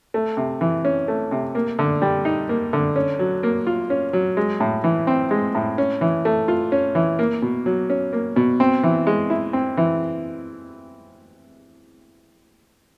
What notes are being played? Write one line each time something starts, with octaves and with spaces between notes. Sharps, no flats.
A3
C3
E3
C#4
A3
C3
A#3
D3
G3
D#4
A#3
D3
C#4
F#3
A#3
F4
C#4
F#3
G#3
A2
E3
C4
G#3
A2
C#4
E3
A3
F4
C#4
E3
A#3
B2
F#3
C#4
A#3
B2
C4
E3
G#3
E4
C4
E3